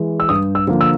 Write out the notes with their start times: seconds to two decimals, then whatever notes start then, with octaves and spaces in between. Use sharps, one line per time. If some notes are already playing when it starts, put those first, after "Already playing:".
Already playing: E3 G#3
0.20 E6
0.29 G2 D#6
0.55 E6
0.67 D3 F3 A#3
0.81 E6